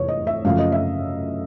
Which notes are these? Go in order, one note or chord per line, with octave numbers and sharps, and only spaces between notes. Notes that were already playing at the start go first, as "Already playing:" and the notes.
Already playing: F1 E2 C#5
D#5
E5
F#2 C#3 F3 A3 F5
D#5
E5